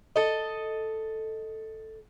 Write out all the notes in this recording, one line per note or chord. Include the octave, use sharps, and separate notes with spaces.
A4 D#5